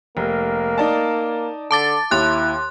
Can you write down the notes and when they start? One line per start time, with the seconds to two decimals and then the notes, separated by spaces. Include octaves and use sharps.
0.17 F1 A#3
0.78 D#4 D5 A5
1.71 D3 A5 D6 A6
2.11 D#2 E4 C6 F#6